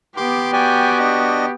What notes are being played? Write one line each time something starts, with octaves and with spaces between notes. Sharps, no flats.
B3 G4 C6 D6
F#4 D5 G5 G#5
D4 D#5